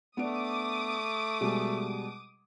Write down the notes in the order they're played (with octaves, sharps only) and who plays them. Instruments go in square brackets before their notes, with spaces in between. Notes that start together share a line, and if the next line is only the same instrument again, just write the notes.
[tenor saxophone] A3 [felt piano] B3 D4 D7 [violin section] D6 D#6
[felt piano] B2 G3 G#3